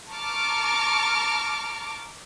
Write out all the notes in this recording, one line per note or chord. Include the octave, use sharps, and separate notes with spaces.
A5 A#5 C#6 D6 F6